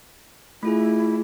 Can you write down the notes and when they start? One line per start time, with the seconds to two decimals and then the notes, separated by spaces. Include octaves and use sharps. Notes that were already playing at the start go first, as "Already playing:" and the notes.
0.63 A3 E4 F4 G#4